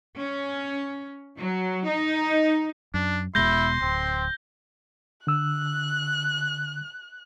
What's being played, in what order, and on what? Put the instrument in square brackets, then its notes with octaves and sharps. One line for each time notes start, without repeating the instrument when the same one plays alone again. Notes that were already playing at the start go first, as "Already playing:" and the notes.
[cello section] C#4
F#3
D#4
[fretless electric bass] F#2 [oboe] D4
[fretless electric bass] E1 B2 G#3 [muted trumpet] E4 [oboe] C6 [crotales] G6 A#6 G7
[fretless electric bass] D1 [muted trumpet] C4
[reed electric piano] D3 E6 [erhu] F#6